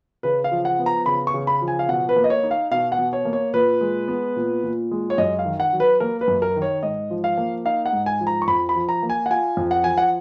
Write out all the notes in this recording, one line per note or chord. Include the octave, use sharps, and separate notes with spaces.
C#3 B4
F5
F3
F#5
B3
A#5
C#3 B5
C#6
C#3
B5
F3
G#5
F5
B2 F#5
B4
A#3
D#5
C#5
D#4
F5
B2 F5
F#5
B2
C#5
A#3
C#5
A#2 B4
G#3
B3
A#2
A#2
G#3
C#5
F#2 D#5
F5
D#3
F#5
F#3
B4
A#3 A#4
B4
F#2
A#4
D#3
C#5
G#2 D#5
F3
F5
A#3
D#4 F5
F#5
G#2
G#5
F3
A#5
C#6
F2 B5
B5
F3
A#5
A#3
G#5
F#5
F4 G#5
F2
F#5
F3 G#5
F#5